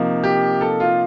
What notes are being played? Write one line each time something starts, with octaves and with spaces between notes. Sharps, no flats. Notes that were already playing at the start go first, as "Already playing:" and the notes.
Already playing: C3 F3 A#3 D#4
G4
A4
F4